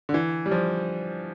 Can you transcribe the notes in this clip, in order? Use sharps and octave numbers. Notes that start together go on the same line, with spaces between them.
D3
E3
G3
F3